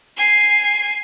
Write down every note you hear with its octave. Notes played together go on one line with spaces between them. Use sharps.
G#5 C7